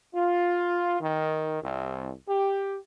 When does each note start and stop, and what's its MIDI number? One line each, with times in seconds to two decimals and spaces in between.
0.14 0.95 65
1.00 1.59 51
1.61 2.11 36
2.27 2.77 67